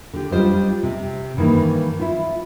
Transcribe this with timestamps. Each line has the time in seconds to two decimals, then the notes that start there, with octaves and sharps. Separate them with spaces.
0.13 D3 G4
0.31 G3 D4 F4 C5 D#5
0.83 C3
1.37 G2 D#3 E3 A#3
2.00 E4 F4